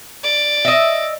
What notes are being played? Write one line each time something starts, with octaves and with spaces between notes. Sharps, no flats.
D5
D#5 E5